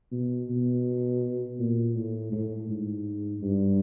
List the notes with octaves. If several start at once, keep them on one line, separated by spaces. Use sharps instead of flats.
B2
B2
A#2
A2
A2
G#2
G2